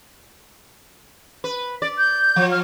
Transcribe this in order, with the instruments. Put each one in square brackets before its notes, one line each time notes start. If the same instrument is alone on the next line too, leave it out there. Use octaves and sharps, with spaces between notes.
[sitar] B4
D5
[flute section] G6
[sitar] F3
[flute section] F6